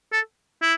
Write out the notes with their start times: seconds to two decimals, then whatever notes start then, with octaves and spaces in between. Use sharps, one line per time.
0.12 A4
0.62 E4